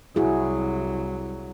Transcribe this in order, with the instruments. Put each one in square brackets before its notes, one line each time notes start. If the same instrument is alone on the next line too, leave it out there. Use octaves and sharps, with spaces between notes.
[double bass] C2 F#3 [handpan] E4 F#4 G#4